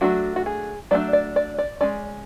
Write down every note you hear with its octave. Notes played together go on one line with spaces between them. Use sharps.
F#3 A3 D4 F#4
F#4
G#4
F#3 A3 D4 D5
D5
D5
D5
G#3 C#4 D5